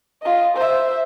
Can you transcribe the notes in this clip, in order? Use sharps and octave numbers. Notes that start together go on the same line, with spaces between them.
F4 D#5
C5 E5